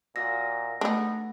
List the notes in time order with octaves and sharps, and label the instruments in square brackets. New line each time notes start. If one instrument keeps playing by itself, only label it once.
[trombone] A#2 [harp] F#4 D#5 E6 [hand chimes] A#6
[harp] A3 [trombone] B3 [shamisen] D4 D#4